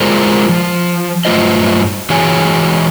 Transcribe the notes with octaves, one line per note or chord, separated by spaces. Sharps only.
G#3 F4 G#4 A#4 C5 D5
F3
G2 F#3 A3 F4 C5 D#5
E3 F#4 G#4 C#5 G#5